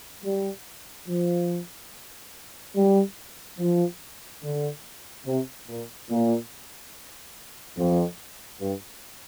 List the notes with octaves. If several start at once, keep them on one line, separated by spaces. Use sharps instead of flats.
G3
F3
G3
F3
D3
C3
A#2
A#2
F2
G2